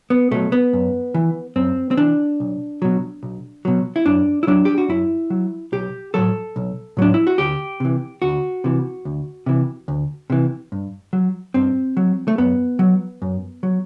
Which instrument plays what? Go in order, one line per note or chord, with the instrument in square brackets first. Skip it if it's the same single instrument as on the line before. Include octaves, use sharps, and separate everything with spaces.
[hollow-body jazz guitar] B3
B2 F#3 A3
B3
F#2
E3
F#2 C4
C4
E3 D4
B1
B2 F#3
B1
B2 F#3
E4
F#2 D4
E4
F#3 D4
G4
F#4
F#2 E4
F#3
B1 G4
A2 F#3 A4
B1
A2 F#3 D4
E4
F#4
D2 G4
C3 E3
D2 F#4
C3 E3
D2
C3 E3
D2
C3 E3
G2
F#3
G2 C4
F#3
A3
F#2 B3
F#3
F#2
F#3